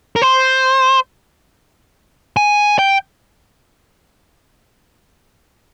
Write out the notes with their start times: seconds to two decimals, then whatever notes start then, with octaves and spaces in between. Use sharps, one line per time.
0.16 A#4
0.22 C5
2.37 G#5
2.79 G5